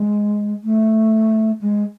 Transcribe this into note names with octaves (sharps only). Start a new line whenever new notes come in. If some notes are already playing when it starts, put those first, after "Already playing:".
Already playing: G#3
A3
G#3